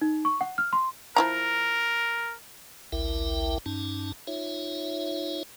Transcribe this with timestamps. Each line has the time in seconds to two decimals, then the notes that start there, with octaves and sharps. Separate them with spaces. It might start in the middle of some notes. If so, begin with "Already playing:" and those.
0.01 D#4
0.25 C#6
0.41 F#5
0.58 F6
0.73 C6
1.16 F3 E4 A#4 A#5
2.92 A1 D2 E4 A#4 E5 G5
3.66 G2 C#4 D#4 A5
4.27 D#4 F4 C#5 E5